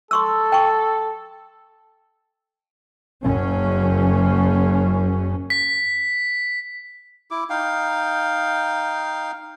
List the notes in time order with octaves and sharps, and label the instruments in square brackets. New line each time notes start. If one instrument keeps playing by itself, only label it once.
[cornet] A4 [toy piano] C6 C#6 E6
[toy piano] G5 C#6
[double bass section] F#1 F#2 C#4
[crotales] B6
[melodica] E4 D6
D#4 F5 G5